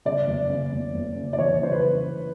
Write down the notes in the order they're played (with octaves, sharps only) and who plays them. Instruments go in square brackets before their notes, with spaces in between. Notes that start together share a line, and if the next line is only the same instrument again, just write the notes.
[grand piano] C#3 [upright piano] D5
[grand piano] F#1
C#3
F#1
F#1
C#3
[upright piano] D5
[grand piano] E2 [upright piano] C#5
[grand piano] C#3 [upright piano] C5
[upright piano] B4
[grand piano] C#3